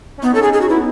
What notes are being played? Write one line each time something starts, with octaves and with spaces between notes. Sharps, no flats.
C#4
B3 D#4
C#4 A4
D#4 G#4
C#4 G#4
F#4
B3 E4